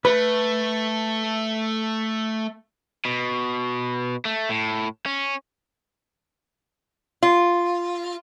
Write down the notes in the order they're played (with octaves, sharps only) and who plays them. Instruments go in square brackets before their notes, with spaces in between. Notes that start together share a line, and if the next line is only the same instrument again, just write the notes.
[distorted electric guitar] A3 [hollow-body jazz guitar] B4
[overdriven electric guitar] B2
A3
A2
C#4
[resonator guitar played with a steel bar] F4